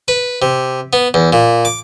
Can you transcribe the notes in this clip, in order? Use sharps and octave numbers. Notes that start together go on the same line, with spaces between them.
B4
C3
B3
E2
A#2
D6